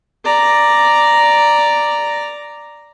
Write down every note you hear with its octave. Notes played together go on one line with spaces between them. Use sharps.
D5 A#5